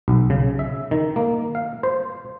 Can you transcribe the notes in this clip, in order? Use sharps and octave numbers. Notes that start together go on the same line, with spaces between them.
B1
C#3
E5
D#3
A#3
F5
C5